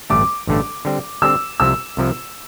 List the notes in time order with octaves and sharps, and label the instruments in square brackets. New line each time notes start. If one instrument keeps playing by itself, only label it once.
[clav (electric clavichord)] A1 G2 D3 A3 [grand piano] D6
[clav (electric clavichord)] A1 G2 D3 A3
D3 G3 C4
[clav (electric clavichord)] D3 G3 C4 [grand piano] E6
[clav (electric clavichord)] C2 C3 F3 [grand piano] E6
[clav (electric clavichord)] C2 C3 F3